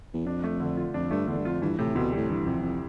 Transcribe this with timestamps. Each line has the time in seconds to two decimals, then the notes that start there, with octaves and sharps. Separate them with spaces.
0.14 E2
0.26 F2 D4
0.44 A3
0.60 D3
0.77 F4
0.94 F2 D4
1.11 G2 A3
1.28 E2 D3
1.39 G2
1.45 F2 F4
1.62 G2 E3
1.79 A2 C3
1.95 D2 B2
2.12 A2 G3
2.30 G2 E3
2.46 F2 C3
2.63 F2